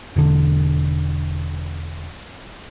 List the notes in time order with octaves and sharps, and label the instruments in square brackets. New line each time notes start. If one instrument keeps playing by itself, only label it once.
[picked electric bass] E1 D3